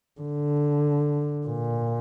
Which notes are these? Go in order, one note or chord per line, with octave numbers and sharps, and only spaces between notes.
D3
A#2